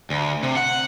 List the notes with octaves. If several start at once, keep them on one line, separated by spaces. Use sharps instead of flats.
D2
C3
F#5